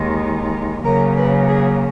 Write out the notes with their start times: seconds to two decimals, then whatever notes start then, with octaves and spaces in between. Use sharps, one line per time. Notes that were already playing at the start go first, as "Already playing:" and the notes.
Already playing: D#2 D#3 G#3
0.85 C#3 F#3 A#3 A#4
1.16 B4
1.48 G#4